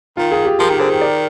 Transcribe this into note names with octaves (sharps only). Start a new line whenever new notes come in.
D#3 F4
F4 G#4
G4
F3 G4 A#4
D#3
D3 G#4 C5
D#3
A#4 D5